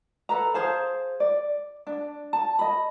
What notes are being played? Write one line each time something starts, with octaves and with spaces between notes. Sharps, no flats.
A4 B4 A#5
G#4 C5 F5 A5
D5
D4
A5
D#5 B5